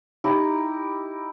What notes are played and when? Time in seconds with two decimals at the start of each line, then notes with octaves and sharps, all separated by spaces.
0.24 D#4 E4 G4